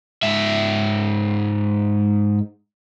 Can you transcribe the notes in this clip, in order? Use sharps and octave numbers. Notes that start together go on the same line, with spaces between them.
G#2 E5